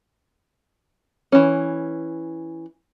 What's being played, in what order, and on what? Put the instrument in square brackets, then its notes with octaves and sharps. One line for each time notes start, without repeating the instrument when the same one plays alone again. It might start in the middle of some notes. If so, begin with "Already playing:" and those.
[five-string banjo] E3 C#4